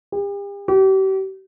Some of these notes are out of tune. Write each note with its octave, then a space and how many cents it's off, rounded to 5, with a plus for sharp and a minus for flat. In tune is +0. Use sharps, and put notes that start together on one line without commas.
G4 +40
G4 -40